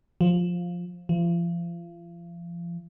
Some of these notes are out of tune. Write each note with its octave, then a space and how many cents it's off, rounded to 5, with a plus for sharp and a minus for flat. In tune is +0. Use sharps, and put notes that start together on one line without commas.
F3 +10
F3 -35